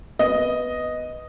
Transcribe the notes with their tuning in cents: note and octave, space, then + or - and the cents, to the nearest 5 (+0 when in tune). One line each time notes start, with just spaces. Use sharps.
B3 +0 D#5 +0